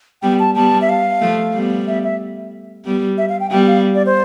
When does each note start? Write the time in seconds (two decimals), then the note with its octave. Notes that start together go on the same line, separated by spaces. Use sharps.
0.22 G3 B3 G5
0.39 A5
0.55 G3 B3 A5
0.81 E5
0.89 F5
1.21 F3 A3
1.54 G3 B3
1.87 E5
2.04 E5
2.85 G3 B3
3.18 E5
3.29 F5
3.40 G5
3.51 G3 B3 G5
3.67 F5
3.95 D5
4.06 C5